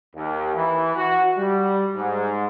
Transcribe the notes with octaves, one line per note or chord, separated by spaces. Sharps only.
D#2
E3
F#4
G3
G#2